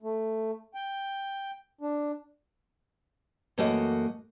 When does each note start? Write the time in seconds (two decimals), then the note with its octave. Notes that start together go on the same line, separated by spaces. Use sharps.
0.02 A3
0.74 G5
1.81 D4
3.58 F#2 E3 A3 A#3 F#4 D#5